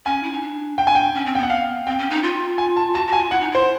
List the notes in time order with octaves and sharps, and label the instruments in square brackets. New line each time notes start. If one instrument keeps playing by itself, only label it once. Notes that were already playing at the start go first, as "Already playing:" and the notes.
[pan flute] C#4 [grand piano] G#5
[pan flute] E4
D#4
D4
[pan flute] D4 [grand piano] G5
[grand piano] G#5
G5
[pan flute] C#4
C4
[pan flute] B3 [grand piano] G5
[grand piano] F#5
F5
[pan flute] C4 [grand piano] G5
[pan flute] C#4
D#4
F4
[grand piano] G#5
A5
[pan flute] F#4 [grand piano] A5
[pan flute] F#4
[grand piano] G#5
[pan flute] F4
[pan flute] E4 [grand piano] F#5
[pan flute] D#4
[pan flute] E4 [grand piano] C5